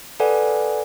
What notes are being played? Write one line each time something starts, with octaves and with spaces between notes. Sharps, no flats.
A4 B4 D5 F#5 G#5